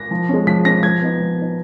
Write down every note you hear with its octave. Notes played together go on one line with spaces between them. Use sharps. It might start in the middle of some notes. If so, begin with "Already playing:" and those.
Already playing: A#6
F3
G#3 C#4
F3 B6
G#3 C#4 A#6
F3 G#6
B3 D#4
F3
B3 D#4